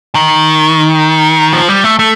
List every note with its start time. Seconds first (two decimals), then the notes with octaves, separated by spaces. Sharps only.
0.15 D#3
1.53 F3
1.69 G3
1.84 A3
1.99 A3